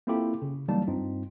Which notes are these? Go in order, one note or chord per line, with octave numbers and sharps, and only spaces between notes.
A#3 C4 E4 F4 G4 A4
C#3
E3 F#3 G3 A#3 D#4 A5
G2 C4 D#4 F4